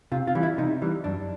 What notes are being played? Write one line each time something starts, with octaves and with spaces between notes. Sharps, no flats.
C3 F4
F4
E3 G3
E4
C3 D#4
E3 G3
F#2 D4